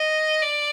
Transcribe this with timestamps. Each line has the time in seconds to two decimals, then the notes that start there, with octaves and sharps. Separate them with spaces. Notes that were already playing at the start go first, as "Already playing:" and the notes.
Already playing: D#5
0.42 D5